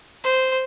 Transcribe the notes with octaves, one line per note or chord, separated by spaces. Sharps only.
C5